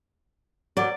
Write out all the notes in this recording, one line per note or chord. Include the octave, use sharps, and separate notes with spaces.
B2 F#3 D5